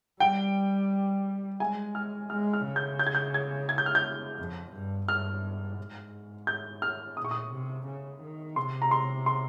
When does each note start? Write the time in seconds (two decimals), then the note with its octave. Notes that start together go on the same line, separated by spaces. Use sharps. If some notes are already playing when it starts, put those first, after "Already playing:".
0.20 G3 G5
1.60 G#3 G#5
1.95 F6
2.29 G#3 F6
2.53 F6
2.65 C#3
2.76 G6
2.99 G6
3.07 G#6
3.15 G6
3.34 G#6
3.69 G#6
3.78 G6
3.86 F6
3.95 G6
4.38 F2
4.73 G2
5.08 G2 F6
5.78 G#2
6.47 G6
6.82 F6
7.17 A#2 D#6
7.25 C#6
7.31 D#6
7.52 C3
7.87 C#3
8.22 D#3
8.56 C3 C6
8.82 A#5
8.91 C6
9.26 C6